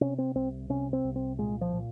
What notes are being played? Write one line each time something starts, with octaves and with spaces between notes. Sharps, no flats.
C3 C#4
C4
C2 C4
C3 C#4
C4
C2
C4
A#2 G#3
F3
A#2